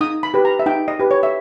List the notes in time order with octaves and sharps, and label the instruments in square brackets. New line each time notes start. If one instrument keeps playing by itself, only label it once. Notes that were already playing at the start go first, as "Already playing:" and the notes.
[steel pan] D#4 D#6
B5
G4 B4
A#5
E5
D#4 G5
D#5
G4 B4
C#5
E5